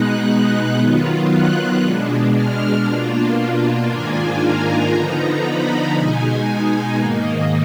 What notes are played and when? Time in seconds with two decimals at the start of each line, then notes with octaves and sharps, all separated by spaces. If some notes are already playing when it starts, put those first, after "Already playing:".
Already playing: B2 G#3 B3 D#4 F#6
0.79 D#3 F#3 B3 F4
1.31 F#6
1.82 B2 G#3 D4
2.34 F6
2.86 B2 A#3 D4 F4
3.88 G#2 D#3 A#3 D4 F4 G#5
4.40 A#5
4.92 D3 F3 B3 D#4 A#5
5.44 B5
5.95 B2 G#3 D#4 G#5
6.98 G#2 D#3 A#3 D#4